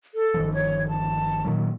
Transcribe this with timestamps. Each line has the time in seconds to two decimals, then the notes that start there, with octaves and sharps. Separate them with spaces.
0.15 A4
0.34 G1 D#3 F3
0.54 C#5
0.88 A5
1.45 A#2 D#3 F#3